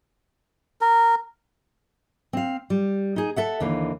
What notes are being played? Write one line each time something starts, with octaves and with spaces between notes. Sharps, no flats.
A#4
C4 F5
G3
D#4 G#4
A4 E5 F#5
D#2 D3 E3 F5